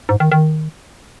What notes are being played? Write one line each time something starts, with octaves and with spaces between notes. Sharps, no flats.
G#2
D#3
D#3